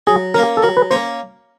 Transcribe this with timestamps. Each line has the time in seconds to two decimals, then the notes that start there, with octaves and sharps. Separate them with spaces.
0.07 F#3 G#4
0.34 A#3 C#4 A#4
0.57 A4
0.62 F#3 A#4
0.77 B4
0.91 A#3 C#4 C5